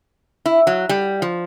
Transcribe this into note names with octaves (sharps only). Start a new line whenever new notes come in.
E4
F#3
G3
F3